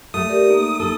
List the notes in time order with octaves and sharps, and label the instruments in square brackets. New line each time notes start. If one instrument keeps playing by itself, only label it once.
[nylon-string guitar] A3 [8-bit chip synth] D#6
[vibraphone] G4 A#4 D5
A#3 D#4
[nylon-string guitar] A4